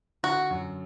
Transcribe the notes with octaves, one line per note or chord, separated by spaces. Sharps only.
D3 F#4
F#2